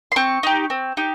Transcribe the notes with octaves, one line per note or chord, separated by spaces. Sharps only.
C6
C4 C#6
D#4 G4
C4
D#4 G4